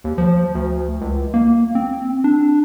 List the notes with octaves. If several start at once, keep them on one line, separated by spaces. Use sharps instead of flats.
D#2
F3
D2
C#2
A#3
C4
D4